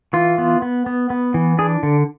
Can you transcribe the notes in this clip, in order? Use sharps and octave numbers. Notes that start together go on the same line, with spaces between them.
E3 F4
B3
B3
B3
B3
E3
D4 G#4
D3